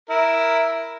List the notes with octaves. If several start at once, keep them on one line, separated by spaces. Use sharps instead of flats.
E4 A#4